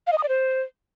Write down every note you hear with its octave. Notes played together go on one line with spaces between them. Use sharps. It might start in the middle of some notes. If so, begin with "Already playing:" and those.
F5
D#5
D#6
D5
C5